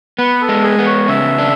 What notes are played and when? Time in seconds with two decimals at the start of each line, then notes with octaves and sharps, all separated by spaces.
0.18 B3 B4
0.41 A4
0.49 G#3
0.63 G#4
0.79 B3
0.86 C#5
1.08 C#3 E5
1.39 D4